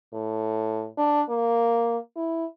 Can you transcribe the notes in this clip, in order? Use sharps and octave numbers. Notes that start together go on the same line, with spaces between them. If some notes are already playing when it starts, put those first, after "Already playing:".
A2
D4
A#3
E4